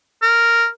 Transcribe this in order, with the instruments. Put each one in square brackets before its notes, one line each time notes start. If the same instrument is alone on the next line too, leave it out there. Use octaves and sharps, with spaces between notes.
[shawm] A#4